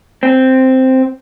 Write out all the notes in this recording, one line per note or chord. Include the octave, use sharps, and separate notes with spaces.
C4